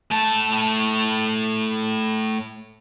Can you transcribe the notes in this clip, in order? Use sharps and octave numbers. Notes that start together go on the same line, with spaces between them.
A2 A5